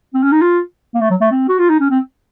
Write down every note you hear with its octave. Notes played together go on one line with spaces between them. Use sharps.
C4
C#4
D#4
F4
A#3
A3
F#3
A3
C4
F#4
F4
D#4
C#4
C4